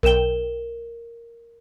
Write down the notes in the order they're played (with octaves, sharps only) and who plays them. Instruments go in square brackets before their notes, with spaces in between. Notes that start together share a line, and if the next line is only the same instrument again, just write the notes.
[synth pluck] B1 G5 [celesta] A#4 E7 G7